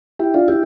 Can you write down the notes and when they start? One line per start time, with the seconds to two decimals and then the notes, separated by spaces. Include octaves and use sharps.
0.19 E4 G4
0.34 D4 F4
0.48 E4 G4